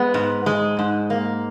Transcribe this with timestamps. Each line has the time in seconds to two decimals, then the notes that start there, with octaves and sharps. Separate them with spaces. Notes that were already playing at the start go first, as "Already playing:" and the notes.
Already playing: G#3 B3
0.14 G#2
0.46 G#3
0.79 G#2
1.10 A#3